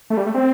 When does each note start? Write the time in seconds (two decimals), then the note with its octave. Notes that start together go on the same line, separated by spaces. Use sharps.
0.10 A3
0.17 G3
0.26 A3
0.34 C4